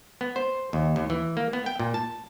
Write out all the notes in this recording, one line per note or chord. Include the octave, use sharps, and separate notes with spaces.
B3
C5
D#2
D#2
E3
A#3
B3
G5
A#2
A5